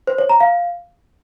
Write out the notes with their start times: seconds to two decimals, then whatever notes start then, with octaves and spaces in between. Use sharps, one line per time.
0.07 C5
0.18 C#5
0.29 A#5
0.40 F5